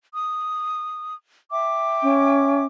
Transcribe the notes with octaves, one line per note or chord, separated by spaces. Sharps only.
D#6
E5 G5 D6
C#4